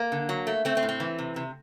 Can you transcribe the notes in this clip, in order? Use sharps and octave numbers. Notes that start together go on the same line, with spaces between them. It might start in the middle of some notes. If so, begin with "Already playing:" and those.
Already playing: A#3
D3
F#3
A3
A3 C4
C4
A2
C4
E3
C3
C3